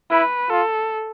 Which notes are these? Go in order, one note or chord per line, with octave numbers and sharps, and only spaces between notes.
E4 B4
F4 A4